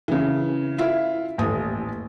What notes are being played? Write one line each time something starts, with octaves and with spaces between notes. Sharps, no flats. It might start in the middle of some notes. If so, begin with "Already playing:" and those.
C#3 E3
E4 F4 E5
D#1 A1 D#6